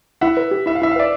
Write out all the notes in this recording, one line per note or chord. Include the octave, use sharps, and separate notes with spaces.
E4 E5 F#5
B4
G4
E4 E5
F5
E4 E5
F5
B4 D5 E5